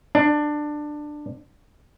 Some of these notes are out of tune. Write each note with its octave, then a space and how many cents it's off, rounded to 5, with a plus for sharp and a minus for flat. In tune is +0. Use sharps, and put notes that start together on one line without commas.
D4 +15